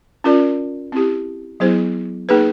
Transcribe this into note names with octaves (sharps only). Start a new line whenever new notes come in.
C#4 F4 A#4 D5
C4 E4 G4
F#3 B3 E4 G#4 C5
A#3 D#4 G#4 B4